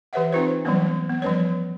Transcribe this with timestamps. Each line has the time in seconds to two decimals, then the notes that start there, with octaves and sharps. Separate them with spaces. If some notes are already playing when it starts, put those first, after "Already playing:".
0.13 E3 G4 B4 C#5 E5 F#5
0.33 C4 D#4 F4 B4 C5
0.65 E3 F#3 G3 A3 B3 C#4
1.09 B3
1.22 F3 G3 C#4 B4 C#5